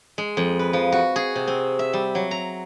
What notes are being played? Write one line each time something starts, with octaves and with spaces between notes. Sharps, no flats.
G#3
F2
B4
F3
F#4
G#4
C3
C4
E5
G3
F#3
A#5